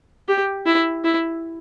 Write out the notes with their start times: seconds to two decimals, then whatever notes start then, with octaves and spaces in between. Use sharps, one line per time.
0.28 G4
0.66 E4
1.04 E4